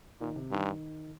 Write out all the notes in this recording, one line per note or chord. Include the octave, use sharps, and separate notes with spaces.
A#2 D#3
C3
G2 D#3